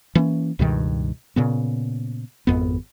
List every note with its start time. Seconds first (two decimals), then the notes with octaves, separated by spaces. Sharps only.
0.15 E3 A#3 C4 C#4
0.59 C#2 G2 B2 D#3
1.36 A#2 C#3 B3
2.47 G#1 F2 B3